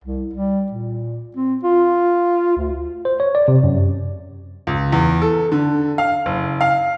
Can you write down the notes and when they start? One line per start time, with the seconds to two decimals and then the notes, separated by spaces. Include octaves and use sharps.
0.04 C2
0.34 G3
0.72 A#2
1.36 C4
1.64 F4
2.57 D2
3.05 C5
3.20 C#5
3.35 D5
3.48 C3
3.64 F#2
4.67 C#2
4.93 E2
5.22 A4
5.52 D3
5.98 F5
6.26 F#1
6.61 F5